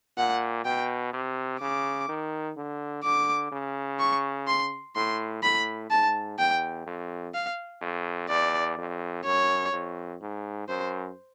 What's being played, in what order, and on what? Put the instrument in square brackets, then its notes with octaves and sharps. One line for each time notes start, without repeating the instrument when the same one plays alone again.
[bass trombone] A#2 [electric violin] F#5
[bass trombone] B2 [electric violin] G5
[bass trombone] C3
[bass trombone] C#3 [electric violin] D6
[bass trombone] D#3
D3
[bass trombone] D3 [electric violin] D6
[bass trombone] C#3
[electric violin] C#6
C6
[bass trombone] A2 [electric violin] C6
[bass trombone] A2 [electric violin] B5
[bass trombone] G#2 [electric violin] A5
[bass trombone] E2 [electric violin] G5
[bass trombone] F2
[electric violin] F5
[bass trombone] F2
[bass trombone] E2 [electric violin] D5
[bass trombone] F2
[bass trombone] F#2 [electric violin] C#5
[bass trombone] F2
G#2
[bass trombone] F#2 [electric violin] C5